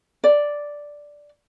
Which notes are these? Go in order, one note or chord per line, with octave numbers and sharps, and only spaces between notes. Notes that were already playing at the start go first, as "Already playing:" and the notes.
D5